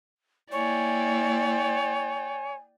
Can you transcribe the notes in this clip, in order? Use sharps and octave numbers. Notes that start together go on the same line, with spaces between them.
A#3 E4 C#5 D5 G5 G#5